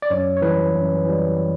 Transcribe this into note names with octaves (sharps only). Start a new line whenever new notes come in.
D5
F#2 C#5
C#5
E3 G3 B4
F#2
E3 G3